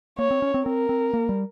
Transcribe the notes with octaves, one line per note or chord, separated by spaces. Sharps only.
A#3 C#5
C4
C#4
C4
C4 A#4
C4
A#3
G3